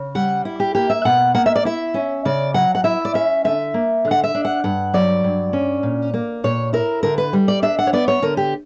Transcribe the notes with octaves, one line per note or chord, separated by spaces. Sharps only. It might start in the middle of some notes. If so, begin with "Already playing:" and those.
Already playing: C#3
G3 F#5
E4
G4
A#3 G4
E5
B2 F#5
A#3 F#5
E5
D5
E4 E5
C#4
C#3 D5
F#3 F#5
F#5
E4 E5
D5
C#4 E5
D3 E5
A#3
D3
F#5
E5
D4
F#5
G2 F#5
F#3 D5
G2
C#4
A#2
A#3
A#2 C#5
E4 A#4
D3 A#4
B4
G3
D5
D4 E5
F#5
C#5
B3 D5
C#5
D3 A#4
G4